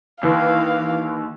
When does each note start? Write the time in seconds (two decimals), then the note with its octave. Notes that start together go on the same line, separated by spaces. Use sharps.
0.23 D#2 E3 F5